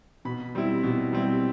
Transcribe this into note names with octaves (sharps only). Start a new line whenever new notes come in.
B2 B5
G3 C4 E4
B2
G3 C4 E4